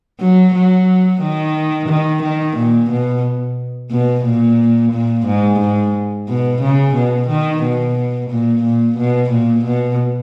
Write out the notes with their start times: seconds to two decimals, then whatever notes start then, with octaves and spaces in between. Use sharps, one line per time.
0.19 F#3
0.54 F#3
1.21 D#3
1.88 D#3
2.22 D#3
2.57 A#2
2.90 B2
3.91 B2
4.25 A#2
4.92 A#2
5.26 G#2
5.59 G#2
6.28 B2
6.61 C#3
6.95 B2
7.29 D#3
7.62 B2
8.30 A#2
8.63 A#2
8.97 B2
9.30 A#2
9.65 B2